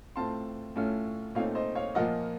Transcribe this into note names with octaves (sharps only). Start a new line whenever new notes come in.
A2 A3 C4 F4 A5 C6
A2 A3 C#4 F4
A#2 A3 C4 D#4 C#5 F5
C5 D#5
C#5 F5
A#2 F3 A#3 F4 D#5 F#5